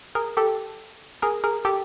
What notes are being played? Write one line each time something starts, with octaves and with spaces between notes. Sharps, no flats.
G#4 A#4
G4 A4
G#4 A#4
G#4 A#4
G4 A4